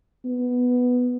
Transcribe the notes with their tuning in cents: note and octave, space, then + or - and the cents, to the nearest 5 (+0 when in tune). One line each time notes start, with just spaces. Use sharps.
B3 +0